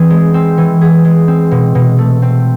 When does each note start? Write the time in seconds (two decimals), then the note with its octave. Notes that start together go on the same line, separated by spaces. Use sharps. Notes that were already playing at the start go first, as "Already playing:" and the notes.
Already playing: E3 C4 G#4
0.10 G#3
0.34 C4
0.58 E3
0.81 G#4
1.05 G#3
1.28 C4
1.51 B2
1.75 B2
1.98 A3
2.22 C4